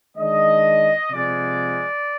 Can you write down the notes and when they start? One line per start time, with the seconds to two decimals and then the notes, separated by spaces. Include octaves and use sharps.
0.16 D#3 G#3 D4 D#5
1.10 C3 F3 G#3 D5